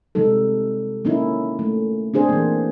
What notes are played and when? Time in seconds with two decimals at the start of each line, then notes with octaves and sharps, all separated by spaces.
0.15 C3 G3 G#3 D#4 A4
1.05 A#3 C#4 D#4 E4
1.59 A3
2.14 C4 D4 G#4 C5
2.29 E3 A#3